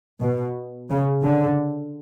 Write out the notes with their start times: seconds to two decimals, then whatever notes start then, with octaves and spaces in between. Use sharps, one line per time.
0.20 B2
0.89 C#3
1.23 D3